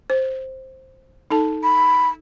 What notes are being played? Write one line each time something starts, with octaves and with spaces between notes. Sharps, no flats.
C5
D#4 A4 A5
B5